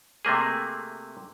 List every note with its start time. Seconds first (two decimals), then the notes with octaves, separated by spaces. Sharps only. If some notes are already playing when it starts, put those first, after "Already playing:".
0.25 C3 A3 A#3 G#4